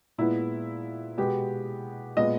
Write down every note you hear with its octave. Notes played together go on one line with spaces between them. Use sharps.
A#2 G#3 B3 E4
B2 G#3 B3 G4
A#2 G#3 B3 D#5